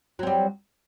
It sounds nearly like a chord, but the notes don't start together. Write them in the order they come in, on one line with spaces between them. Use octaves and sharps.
F#3 C4 G3